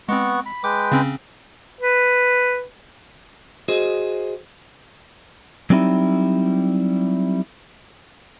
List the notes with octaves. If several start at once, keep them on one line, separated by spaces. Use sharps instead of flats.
G#3 B3 C4 F#5 C#6
B5
G#3 B4 G5 D6
C#3 C4 C#4
B4
F#4 G#4 C5 D#5
F#3 G3 C4 D#4 E4